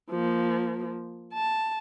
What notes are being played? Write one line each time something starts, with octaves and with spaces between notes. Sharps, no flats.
F3 A#3
A5